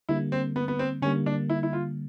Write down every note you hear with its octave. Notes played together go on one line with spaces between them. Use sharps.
D3 G3 A#3 E4
C4
B3
B3
C4
D3 G3 A#3 C#4
D4
E4
E4
F4